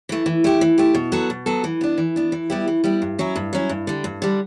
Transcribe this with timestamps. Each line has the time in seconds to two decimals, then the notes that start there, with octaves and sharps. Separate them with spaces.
0.09 E3 A3
0.26 E3
0.44 A3 E4 G4
0.61 E3
0.78 A3 E4 G4
0.95 B2
1.12 F#3 B3 F#4 A4
1.30 B2
1.46 F#3 B3 F#4 A4
1.64 E3
1.81 B3 D4
1.98 E3
2.16 B3 D4
2.32 E3
2.50 G3 B3 E4 G4
2.68 E3
2.84 G3 B3 E4 G4
3.02 G2
3.19 F#3 C#4 E4
3.36 G2
3.53 F#3 C#4 E4
3.69 G2
3.87 D3 G3
4.04 G2
4.22 D3 G3